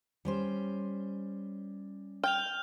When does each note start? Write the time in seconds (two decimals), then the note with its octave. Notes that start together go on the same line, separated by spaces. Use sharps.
0.25 G3 C#4 C5
2.24 G5 F6 G6 F7